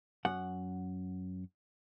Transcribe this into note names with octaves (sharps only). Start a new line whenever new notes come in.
F#2 F#5